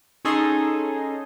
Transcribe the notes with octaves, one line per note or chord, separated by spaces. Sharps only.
C#4 D#4 G#4 A4 D#5 C6